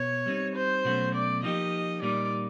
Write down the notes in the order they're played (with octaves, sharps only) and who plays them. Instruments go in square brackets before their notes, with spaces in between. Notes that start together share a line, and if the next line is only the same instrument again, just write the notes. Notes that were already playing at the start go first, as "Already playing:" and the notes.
Already playing: [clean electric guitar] B2 B3 [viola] C#5
[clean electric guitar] G3 C4 D#4
[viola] C5
[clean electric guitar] B2 F#3 A3 C#4 F#4
[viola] D5
[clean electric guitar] F3 A#3 D#4 G4 [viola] D#5
[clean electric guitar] A#2 G3 A#3 D#4 [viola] D5